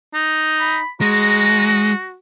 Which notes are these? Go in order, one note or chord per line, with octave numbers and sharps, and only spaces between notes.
D#4
B5
G#3 F#4 A#5